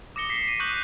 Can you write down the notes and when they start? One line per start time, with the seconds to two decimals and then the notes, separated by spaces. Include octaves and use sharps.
0.16 D6 D#6 A#6 C#7 G7
0.30 B6 C7
0.44 B6 D#7
0.60 C#6 D#6 F#6 G6 C7 F#7